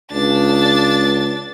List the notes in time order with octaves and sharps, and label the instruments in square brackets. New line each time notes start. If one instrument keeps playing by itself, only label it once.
[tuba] C#2 [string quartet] D4 A6